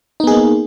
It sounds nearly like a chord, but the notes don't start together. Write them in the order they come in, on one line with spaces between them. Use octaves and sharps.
D#4 B3 G#4 A#3